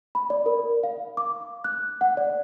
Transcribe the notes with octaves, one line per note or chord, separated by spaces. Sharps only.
B5
D5
A#4
F5
D6
F#6
F#5
D5